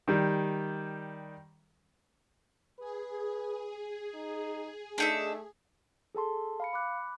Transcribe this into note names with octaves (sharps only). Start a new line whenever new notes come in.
D#3 G3
G#4 B4
D#4
A3 D4 D#4 E5
G#4 A4 A5 C6
F5 B5 C#7
B5 D6 F#6